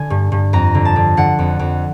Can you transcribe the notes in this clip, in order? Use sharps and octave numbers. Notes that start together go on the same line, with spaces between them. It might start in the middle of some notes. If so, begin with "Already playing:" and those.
Already playing: D3 G#5
G2
G2
F2 A#5
D3
A5
D3
D3 F#5
F2
F2